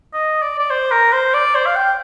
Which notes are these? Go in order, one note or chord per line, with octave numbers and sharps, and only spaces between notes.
D#5
D5
D5
C5
A#4
C5
D5
C5
F5
G5